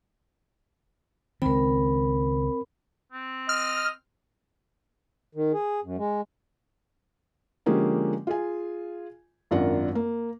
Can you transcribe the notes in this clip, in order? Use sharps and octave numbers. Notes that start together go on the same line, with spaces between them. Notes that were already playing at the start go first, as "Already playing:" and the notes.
C#2 D#3 C4 A#4 B5
C4
D#5 F6
D#3
G#4
F#2
G#3
D3 F3 G#3 A#3 C#4 G4
F4 G#4 G#5
G#1 F#2 D4 F4 A#4 F#5
A#3